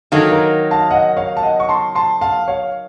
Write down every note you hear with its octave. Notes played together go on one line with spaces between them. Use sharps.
D#3 F#3 A#3 A4
A#4
F5 A5
D#5 F#5
C#5 F5
A5
D#5 F#5
C#6
A5 C6
A5 C6
F5 A5
C#5 F5